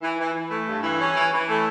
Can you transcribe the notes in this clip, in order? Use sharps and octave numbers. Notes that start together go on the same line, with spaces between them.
E3
E3
E3
A3
G2
E3
C#4
E3
E3
A3